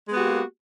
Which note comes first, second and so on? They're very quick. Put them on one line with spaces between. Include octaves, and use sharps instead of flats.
G#3 B3 F#4 G4 A#3